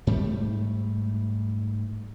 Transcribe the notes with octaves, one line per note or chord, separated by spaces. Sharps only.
G#2 G3 A3